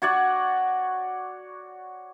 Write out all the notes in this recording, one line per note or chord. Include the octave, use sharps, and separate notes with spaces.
F#4 C#5 D5 F#5